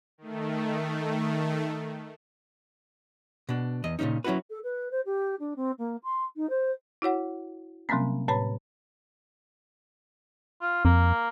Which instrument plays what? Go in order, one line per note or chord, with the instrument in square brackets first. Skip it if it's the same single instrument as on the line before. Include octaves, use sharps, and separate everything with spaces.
[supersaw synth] D#3 A3
[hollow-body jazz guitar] B2 D4
E2 D#5
A#2 C#3 F3 C#4 D#4
F#3 C#4 E4 F#4 B4
[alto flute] A4
B4
C5
G4
D4
C4
A#3
C6
D#4
C5
[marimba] E4 F#4 C#5 F#5
C3 F#3 G3 A#3 C4 C#4
A2 B4 C#5 A#5 B5
[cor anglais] F4
[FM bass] F2 [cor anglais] A#3